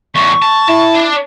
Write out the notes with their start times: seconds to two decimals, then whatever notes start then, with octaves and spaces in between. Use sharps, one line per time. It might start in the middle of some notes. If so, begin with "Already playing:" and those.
0.15 E2 A2 C#6
0.42 A5
0.69 E4 A5
0.95 D4